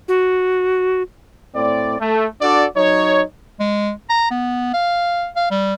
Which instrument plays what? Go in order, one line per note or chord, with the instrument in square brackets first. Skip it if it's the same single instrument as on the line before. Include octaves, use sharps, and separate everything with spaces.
[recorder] F#4
[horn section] A2 C4 D5
A3
D4 F#4 A4 D5
F#3 D#4 C#5
[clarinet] G#3
A#5
B3
F5
F5
G3